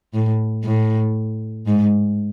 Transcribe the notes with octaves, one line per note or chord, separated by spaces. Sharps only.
A2
A2
G#2